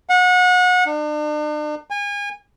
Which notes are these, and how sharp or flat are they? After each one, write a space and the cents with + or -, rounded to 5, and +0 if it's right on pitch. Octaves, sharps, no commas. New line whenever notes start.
F#5 -30
D4 +40
G#5 -30